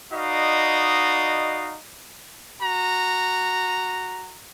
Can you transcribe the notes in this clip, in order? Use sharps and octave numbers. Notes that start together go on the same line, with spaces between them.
D#4 F#4 B4 D5 D#5 F5
F#4 A#5